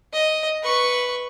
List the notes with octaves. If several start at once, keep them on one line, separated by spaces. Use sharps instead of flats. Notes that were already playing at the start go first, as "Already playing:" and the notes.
D#5
B4 C#6